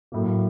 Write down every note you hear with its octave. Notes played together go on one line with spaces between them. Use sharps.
A2 F#3 A#3